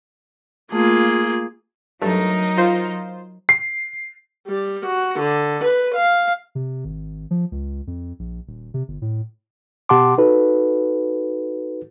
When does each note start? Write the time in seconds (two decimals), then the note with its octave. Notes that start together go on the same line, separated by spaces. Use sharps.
0.72 A3 A#3 F4 G#4
2.02 G2 F#3 A3 D#4 A#4
2.58 F4 C5
3.49 C7
4.48 G3
4.86 F#4
5.19 D3
5.64 B4
5.95 F5
6.55 C3
6.85 G#1
7.31 F3
7.52 C#2
7.87 F2
8.19 A#1
8.47 D#1
8.74 C3
8.88 G1
9.02 A2
9.89 B2 G4 F#5 A5 C6 D6
10.18 D#4 F#4 A4 B4